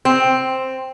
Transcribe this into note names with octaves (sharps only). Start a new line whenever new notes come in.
C4